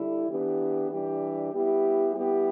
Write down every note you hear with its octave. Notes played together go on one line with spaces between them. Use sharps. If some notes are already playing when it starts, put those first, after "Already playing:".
Already playing: D3 G3 E4
E3 B3 D4 G4
E3 G3 D4 G4
G3 B3 E4 G4
G3 B3 E4 G4